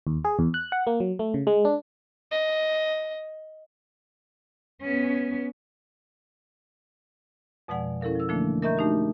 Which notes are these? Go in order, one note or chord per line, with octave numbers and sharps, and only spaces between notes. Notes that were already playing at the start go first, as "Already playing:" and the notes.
D#2
G#4
E2
F#6
F#5
A#3
F#3
A3
C#3
G#3
D4
D#5
B3 C#4
F2 B2 F3 G#3 D5 F#5
C#4 E4 A4 A#4 F5
F3 E6
D3 E3 F3 A3 A#3 D4
A#4 D#5 E5 A#5 C#6 G6
A3 D4 D#4 F#4 G4